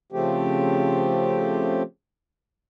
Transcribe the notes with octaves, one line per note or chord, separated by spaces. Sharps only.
C#3 F3 A3 C4 G4